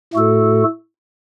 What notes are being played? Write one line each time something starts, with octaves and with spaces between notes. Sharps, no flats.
A2 A3 F#4 A4